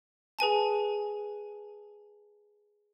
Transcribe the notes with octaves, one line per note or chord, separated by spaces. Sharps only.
G#4 B4 G#5 A5